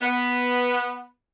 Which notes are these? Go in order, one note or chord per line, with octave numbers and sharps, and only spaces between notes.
B3